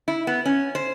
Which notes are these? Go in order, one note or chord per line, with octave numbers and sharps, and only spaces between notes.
E4
B3
C#4
C5